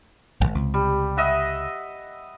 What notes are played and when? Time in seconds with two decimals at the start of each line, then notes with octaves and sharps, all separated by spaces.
0.40 D#1 G#1
0.55 C#2 C3
0.74 G3
1.17 D#5 E5 F#5